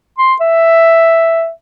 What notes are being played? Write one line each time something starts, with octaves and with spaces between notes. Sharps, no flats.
C6
E5